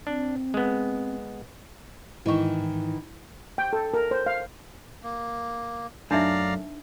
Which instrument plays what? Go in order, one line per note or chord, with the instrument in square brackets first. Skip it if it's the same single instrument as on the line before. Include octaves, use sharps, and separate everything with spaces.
[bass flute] C4 [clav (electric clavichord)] D4
[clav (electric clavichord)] G#3 B3
[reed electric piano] G#2 [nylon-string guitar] D#3 E3 [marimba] E4 D#5 C#6
[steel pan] G5
A4
A#4
C5
F5
[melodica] A#3
[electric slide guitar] F#2 A3 [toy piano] D4 D#4 E5 [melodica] D5 F5 A#5